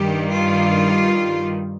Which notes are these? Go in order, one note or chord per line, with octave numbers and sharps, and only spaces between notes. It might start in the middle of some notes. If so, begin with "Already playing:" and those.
Already playing: G2 D#3 G3 G4
F4